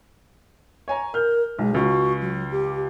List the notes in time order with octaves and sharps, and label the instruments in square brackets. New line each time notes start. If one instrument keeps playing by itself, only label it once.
[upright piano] C#5 G#5 A#5
[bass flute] A#4 [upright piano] F6 G6
[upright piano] B1 [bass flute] G#3
[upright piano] C#2 [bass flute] F#4
[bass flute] F#3
G4